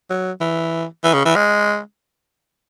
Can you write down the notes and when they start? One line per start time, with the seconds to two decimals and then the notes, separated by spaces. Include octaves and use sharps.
0.10 F#3
0.41 E3
1.04 E3
1.14 C#3
1.25 E3
1.36 G#3